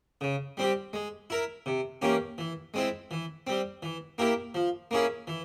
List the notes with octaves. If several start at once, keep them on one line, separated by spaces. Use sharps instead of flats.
C#3
G3 C4 G4
G#3
E4 A#4
C3
E3 A#3 C#4 G4
E3
G#3 C4 E4
E3
G3 C4
E3
A#3 E4 G4 A#4
F3
A#3 C#4 E4 G#4
E3